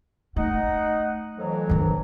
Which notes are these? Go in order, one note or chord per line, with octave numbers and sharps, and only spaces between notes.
A3 D#4 F#5
F2 E3 F#3
D#3 D4